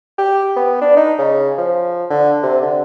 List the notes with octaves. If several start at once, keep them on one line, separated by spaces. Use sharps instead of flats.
G4
B3
D4
D#4
C#3
F3
D3
C3
D3